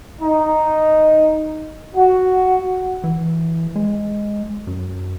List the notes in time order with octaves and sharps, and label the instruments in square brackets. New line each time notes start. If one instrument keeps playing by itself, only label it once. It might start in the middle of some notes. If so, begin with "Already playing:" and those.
[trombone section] D#4
F#4
[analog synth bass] E3
G#3
F#2